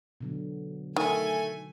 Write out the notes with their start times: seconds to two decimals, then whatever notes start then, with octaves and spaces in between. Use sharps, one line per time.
0.21 B2 D3 F#3
0.96 D#3 A3 G#5